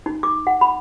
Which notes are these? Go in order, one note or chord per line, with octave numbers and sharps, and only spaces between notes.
D#4
D6
F#5
B5